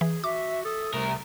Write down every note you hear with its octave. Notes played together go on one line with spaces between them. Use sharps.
E3 G#4
F#4 E5 D6
A4 D#6
C2 A3 A#4